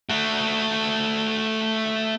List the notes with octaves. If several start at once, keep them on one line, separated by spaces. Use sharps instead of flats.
A3 F#4